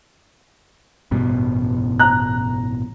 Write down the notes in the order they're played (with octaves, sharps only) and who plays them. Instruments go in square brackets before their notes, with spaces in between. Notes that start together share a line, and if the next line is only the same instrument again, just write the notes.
[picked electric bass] A1 G2 B2
[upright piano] A#5 F#6